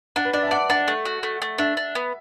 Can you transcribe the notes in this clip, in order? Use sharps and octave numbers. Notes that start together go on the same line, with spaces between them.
D4 F#5
B4
D4 D5
E5
A5
D5 F#5
D4 F#5
A3
F#4
A3
A3
D4 E5
D4
B3